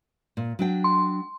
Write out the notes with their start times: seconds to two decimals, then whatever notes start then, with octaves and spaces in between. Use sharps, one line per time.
0.37 A#2
0.59 F#3 D4 G5
0.84 C6